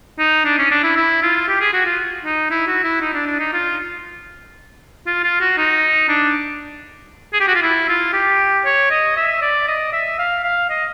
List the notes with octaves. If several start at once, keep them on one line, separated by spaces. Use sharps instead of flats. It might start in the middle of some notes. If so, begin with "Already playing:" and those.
D#4
D4
C#4
D4
E4
E4
F4
G4
G#4
F#4
F4
D#4
E4
F#4
E4
D#4
D4
D4
D#4
F4
F4
F4
F#4
D#4
D4
G#4
G4
F#4
F4
E4
F4
G4
C#5
D#5
E5
D5
D#5
E5
F5
F5
D#5